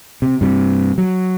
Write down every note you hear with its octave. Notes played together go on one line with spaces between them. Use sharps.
C3
G2 C3
F#3